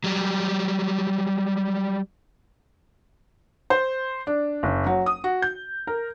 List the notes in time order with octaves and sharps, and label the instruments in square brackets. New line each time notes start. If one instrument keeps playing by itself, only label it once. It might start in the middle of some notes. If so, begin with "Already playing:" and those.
[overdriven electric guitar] F#3 G3
[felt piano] C5
D4
F#1
F#3
D#6
F#4
G6
A#4